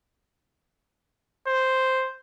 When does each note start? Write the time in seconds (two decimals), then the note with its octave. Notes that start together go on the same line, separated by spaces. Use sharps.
1.48 C5